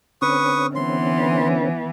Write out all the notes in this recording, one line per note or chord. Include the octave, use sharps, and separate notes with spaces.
D3 C4 C#4 B4 C#6 D#6
E3 B3 C6